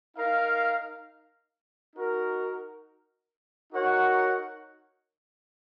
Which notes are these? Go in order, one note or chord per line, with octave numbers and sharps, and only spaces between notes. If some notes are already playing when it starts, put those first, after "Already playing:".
D#4 A#4 F5
D#4 F#4 A#4
D#4 F#4 A#4 C#5 F#5